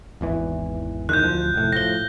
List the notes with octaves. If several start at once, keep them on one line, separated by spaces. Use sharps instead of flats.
G#1 E2 E3
D1 E2 D#3 F#6 G6
D1 B1 F3
F1 A2
A2 F3 A#6 G7